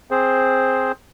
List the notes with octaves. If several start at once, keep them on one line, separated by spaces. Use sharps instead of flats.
C4 G#4 C5